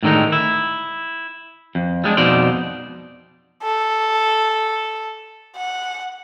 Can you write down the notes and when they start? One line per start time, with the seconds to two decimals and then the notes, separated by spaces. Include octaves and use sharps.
0.03 A2 D3 D#3 G#3 D#4
0.32 E4
1.75 F2
2.04 G3 G#3 D4
2.17 F2 B2 D#4 D5 C6
3.63 A4
5.57 F#5